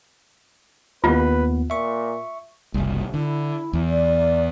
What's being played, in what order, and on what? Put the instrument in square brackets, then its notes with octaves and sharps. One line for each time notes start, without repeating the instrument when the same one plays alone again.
[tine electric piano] D#2 B3 [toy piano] F4 [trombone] B4
[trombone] A#2 [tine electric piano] E5 C#6
[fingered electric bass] F#1 C2
[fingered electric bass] D3 [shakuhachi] E4
[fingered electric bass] E2
[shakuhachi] D5